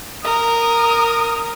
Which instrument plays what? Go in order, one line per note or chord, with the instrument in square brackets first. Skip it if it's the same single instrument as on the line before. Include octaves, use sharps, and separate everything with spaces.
[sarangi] A#4 [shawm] D#6